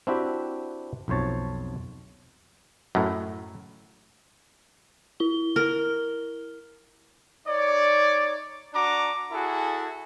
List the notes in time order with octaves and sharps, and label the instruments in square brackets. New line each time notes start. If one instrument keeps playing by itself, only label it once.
[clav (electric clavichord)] C4 D4 E4 F#4 G4 E5
B1 F2 C5 C#5 A5
F#2 A2
[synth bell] E4 G7
[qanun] A#4
[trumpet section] D#4 C#5 D5
D4 F#4 A#5 D6
E4 F#4 G#4 A4